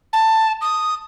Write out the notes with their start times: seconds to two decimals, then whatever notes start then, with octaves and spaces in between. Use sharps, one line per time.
0.13 A5
0.61 D#6